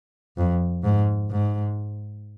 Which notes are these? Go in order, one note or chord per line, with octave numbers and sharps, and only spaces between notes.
F2
G#2
G#2